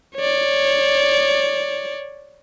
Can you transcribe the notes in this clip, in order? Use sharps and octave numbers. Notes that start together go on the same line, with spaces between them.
C#5 D5